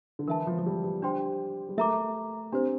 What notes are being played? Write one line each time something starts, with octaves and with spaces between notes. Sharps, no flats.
D3
E3 A#4 E5 A5
F3
F3
G3
G3
D4 G4 C5 G5 C6
G3
A3 A#4 E5 A#5 D6
C4 D4 G4 C5